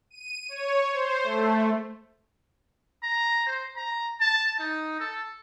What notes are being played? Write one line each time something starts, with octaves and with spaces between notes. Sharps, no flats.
D#7
C#5
C5
A3
A#5
C5
A#5
A5
D#4
A4